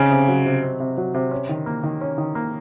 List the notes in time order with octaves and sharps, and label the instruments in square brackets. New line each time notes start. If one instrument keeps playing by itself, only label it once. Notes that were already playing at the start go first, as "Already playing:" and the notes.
Already playing: [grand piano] C#3 [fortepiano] C4 D#4
[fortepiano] C3
F#3
C3
C4
C3
F#3
C3
C#4
D#3
A#3
D#3
C#4
D#3
A#3